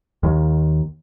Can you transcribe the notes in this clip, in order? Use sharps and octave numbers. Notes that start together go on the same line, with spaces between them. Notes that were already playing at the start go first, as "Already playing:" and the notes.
D#2 D#3